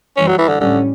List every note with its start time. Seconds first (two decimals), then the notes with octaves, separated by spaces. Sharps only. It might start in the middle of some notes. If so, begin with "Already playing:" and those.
0.17 F#2 E3 G3 C#4
0.27 F#3
0.38 E3
0.49 D3
0.60 A2 D3 G3 C#4